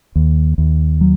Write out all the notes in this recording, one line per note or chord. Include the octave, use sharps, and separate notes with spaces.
D#2
D#2
F#3